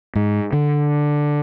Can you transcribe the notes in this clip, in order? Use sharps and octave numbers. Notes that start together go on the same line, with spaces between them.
G#2
D3